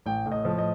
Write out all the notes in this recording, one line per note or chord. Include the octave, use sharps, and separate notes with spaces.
A1 G5
A2
D#5
F3
D#5